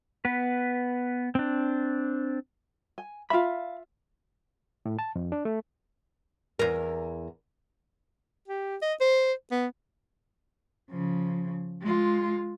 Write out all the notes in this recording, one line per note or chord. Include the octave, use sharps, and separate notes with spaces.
B3 B4
C4 D4
G#5
F4 E5 F5 B5
A2
A5
F2
D4
A3
E2 A#4
G4
D#5
C5
B3
C#3 F3
G#3 F4